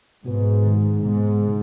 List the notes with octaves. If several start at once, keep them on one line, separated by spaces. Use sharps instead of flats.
G#2 B2 B3 F#4 B4
D#3 G#3 D#4 G#4
G#2 B2 G#3 B3
C#3 G#3 D#4